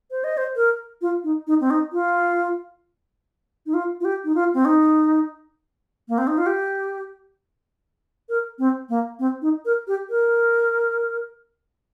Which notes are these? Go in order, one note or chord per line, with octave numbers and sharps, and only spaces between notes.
C5
D#5
C5
A#4
F4
D#4
D#4
C4
D#4
F4
D#4
F4
F4
G4
D#4
F4
C4
D#4
A#3
C4
D#4
F4
G4
A#4
C4
A#3
C4
D#4
A#4
G4
A#4